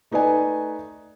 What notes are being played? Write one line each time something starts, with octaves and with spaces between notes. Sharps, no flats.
A3 D#4 B4 D5 G#5